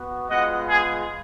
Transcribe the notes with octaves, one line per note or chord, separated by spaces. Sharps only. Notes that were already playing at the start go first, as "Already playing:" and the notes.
Already playing: B3 F#4
G#3 B3 F4 D#5 F#5
G#4